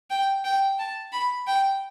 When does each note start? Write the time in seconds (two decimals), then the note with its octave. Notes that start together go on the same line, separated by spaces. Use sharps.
0.10 G5
0.45 G5
0.79 A5
1.13 B5
1.47 G5